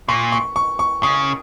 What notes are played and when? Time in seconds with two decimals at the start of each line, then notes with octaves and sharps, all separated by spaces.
0.08 A#2 C#6
0.32 C#6
0.56 C#6
0.79 C#6
1.03 C#3 D#6